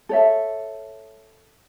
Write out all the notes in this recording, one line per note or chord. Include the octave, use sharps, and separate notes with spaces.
A4 C#5 E5